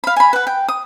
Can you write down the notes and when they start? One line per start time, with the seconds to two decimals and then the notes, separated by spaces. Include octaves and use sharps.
0.04 F5 B5
0.16 G#5 B5
0.33 B4 F#5
0.47 G5
0.69 D#6